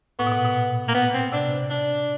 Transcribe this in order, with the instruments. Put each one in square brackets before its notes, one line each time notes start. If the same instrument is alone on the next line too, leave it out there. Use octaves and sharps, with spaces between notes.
[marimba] A2 [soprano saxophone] B3
[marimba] B2
A#2
B2
[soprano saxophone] A#3
B3
C4
[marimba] C3 [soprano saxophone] D4
[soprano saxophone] D4